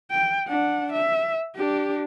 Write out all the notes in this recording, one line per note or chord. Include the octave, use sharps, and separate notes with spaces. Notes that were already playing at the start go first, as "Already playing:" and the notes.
G5
D4 F#5
E5
D4 G4